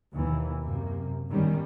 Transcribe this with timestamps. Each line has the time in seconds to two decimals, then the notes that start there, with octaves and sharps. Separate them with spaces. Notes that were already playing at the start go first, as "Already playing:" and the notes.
0.12 D#2 B2 E3
0.61 F#2 C3 A#3
1.28 G1 A2 D#3 G3 C#4